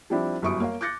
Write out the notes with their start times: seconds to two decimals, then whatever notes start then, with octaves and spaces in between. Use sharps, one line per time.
0.10 F3 G3 C4 D4 E4
0.42 G1 F#2 E4 C#6 D#6 D7
0.60 A#3 C#5 F5
0.81 D6 F#6 G6 A6 A#6 C#7